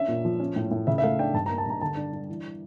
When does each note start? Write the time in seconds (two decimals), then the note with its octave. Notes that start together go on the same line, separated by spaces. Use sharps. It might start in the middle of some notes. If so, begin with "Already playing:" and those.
Already playing: C#4 D4 E5
0.08 A#2
0.25 F3
0.40 C#4
0.56 A2
0.71 A2
0.87 C#3 E5
0.98 E5
1.03 A3 F5
1.19 D4 G5
1.34 G2 A5
1.46 A#5
1.50 A#3
1.58 A5
1.66 G2 A#5
1.81 D3 A5
1.97 D4
2.13 D4
2.29 E3